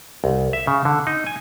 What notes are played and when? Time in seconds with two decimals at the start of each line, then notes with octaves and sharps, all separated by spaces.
0.24 C2
0.53 E5
0.67 C#3
0.85 D3
1.07 D#4
1.27 G#5